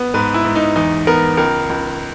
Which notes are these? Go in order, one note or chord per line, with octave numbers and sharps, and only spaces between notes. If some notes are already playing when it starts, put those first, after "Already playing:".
Already playing: B3
G#2 B4
E4
G#2
D#4
E2 D#4
B3 A#4
C#2 A#4
C#2